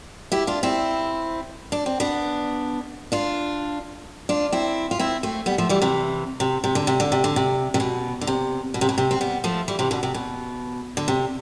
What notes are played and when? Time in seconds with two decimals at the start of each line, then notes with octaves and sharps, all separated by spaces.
0.32 E4 G4
0.47 D4 F4
0.63 C4 E4
1.72 D4
1.86 C4
2.00 B3 D4
3.12 D4 F4
4.29 D4 F4
4.52 C4 E4
4.91 F4
4.99 C4 E4
5.23 A3 C4
5.46 G3 B3
5.58 F3 A3
5.69 E3 G3
5.82 C3 E3
6.40 C3
6.64 C3
6.75 D3
6.87 C3
7.00 D3
7.12 C3
7.24 D3
7.36 C3
7.74 C3
7.80 B2
8.21 D3
8.27 C3
8.74 B2
8.81 C3
8.89 B2
8.98 C3
9.11 C4
9.21 G3 B3
9.44 F3 A3
9.68 E3 G3
9.79 C3 E3
9.91 B2 D3
10.03 C3
10.14 B2
10.97 D3
11.08 C3